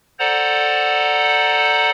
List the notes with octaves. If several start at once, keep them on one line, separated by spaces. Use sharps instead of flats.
A4 C5 D5 F#5 A#5